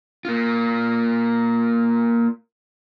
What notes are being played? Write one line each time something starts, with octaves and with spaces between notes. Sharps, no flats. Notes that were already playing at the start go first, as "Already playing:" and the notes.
A#3 F4